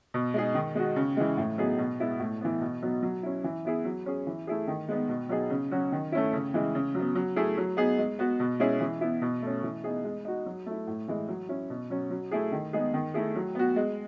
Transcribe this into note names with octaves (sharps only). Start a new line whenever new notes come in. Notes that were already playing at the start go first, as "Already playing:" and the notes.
B2
G#3 D#4 G#4
D#3
G#3 D#4 F#4
C#3
E3 G#3
A2
F#3 B3 D#4 G#4
B2
G#3 B3 E4
A2
E3 B3
B2
F#3 B3 D#4
F#3
C#4 E4
E3
B3 E4 G#4
F#3
C#4 G#4
E3
A3 E4 G#4
D#3
G#3 B3 D#4
B2
F#3 B3 D#4 G#4
C#3
F#3 C#4 F#4
D#3
A3 C#4 E4
C#3
E3 G#3
C#3
F#3
B3
F#3
A3 E4 G#4
F#3
B3 D#4 G#4
G#3
B3 F#4
B2
G#3 C#4 E4 G#4
E3
B3 E4
B2
A3 C#4
E3
B3 D#4 G#4
G#3
D#4 F#4
F#3
A3 E4
A2
E3 G#3
F#3
C#4 E4
B2
F#3 C#4
F#3
A3 E4 G#4
D#3
G#3 B3 D#4 G#4
D#3
A3 E4 G#4
F#3
B3 F#4
G#3